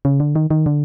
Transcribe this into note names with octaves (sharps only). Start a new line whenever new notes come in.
C#3
D3
D#3
D#3
D3